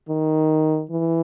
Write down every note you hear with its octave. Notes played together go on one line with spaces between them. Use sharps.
D#3
E3